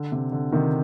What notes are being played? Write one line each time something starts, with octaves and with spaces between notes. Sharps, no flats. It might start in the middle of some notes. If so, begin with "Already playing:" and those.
Already playing: D3
C3
D3
C3 D#3